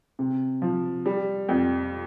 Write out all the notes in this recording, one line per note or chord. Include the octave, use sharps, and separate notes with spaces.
C3
F3
G3
F2